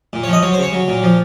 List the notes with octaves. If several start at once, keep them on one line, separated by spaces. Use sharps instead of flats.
A#2
C#5
F3
D#5
F#3 C#5
C5
C#3 C#5
F#3
A#2
F3